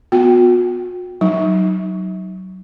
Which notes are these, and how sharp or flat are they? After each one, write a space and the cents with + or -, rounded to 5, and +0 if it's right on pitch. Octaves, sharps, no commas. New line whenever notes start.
B3 +0 F#4 -45 G5 -10
F#3 +15 D#4 +0